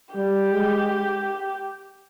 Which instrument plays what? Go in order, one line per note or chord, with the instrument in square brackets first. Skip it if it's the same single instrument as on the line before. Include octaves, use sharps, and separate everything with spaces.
[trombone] G3 [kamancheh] G4
[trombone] G#3